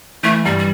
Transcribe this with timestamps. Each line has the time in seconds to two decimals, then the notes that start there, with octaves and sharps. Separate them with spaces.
0.23 E3 A3
0.45 G2 G3
0.58 G3